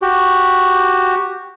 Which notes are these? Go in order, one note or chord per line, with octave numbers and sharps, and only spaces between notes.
F#4 G4